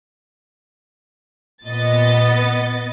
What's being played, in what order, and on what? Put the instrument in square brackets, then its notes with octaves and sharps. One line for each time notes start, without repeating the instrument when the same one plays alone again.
[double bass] A#2 [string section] B3 D#5 A6